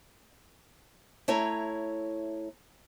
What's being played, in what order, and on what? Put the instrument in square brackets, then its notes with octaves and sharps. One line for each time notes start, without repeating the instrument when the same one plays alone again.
[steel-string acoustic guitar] A3 E4 C#5 A#5